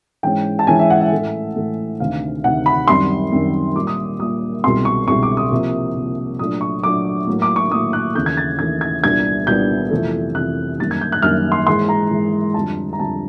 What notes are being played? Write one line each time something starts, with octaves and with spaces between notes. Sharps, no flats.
G#2 E3 G#3 C#4 G5
A5
G#2 E3 G#3 C#4 G#5
E5
F#5
E5
A2 E3 A3
A2 E3 A3
D2 C3 D#3 F5
D2 C3 D#3 F#5
B5
F#2 D#3 G3 C4 C6
F#2 D#3 G3 C4
A#2 G3 A#3 D6
D#6
A#2 G3 A#3 D#6
C2 B2 G#3 C4 C6
C#6
C2 B2 G#3 C4 C#6
D6
D#6
C3 F3 A#3
C3 F3 A#3
A#2 F#3 A3 D4 D#6
C#6
A#2 F#3 A3 D4 D6
A2 F#3 A#3
D6
C#6
A2 F#3 A#3 D#6
F#6
D#2 C#3 E3 A3 G6
G#6
A6
D#2 C#3 E3 A3 G#6
G#6
C2 A#2 G3 B3 D4 G#6
C2 A#2 G3 B3 D4 G6
F2 C3 E3 A3
F2 C3 E3 A3 F#6
F#2 D#3 G3 A#3 A6
G#6
G6
F#6
F#2 D#3 G3 A#3 F6
C6
G#2 E3 G#3 C6
A#5
G#2 E3 G#3
F2 D3 G3 A5
A#5
F2 D3 G3 A5